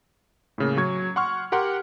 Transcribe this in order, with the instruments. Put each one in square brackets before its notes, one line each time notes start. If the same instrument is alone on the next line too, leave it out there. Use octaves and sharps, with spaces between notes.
[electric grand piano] A2 C#3 A#3
F#3 C#6 G#6
F#5 C6 C#6 F6
G4 A#4 F#5 C6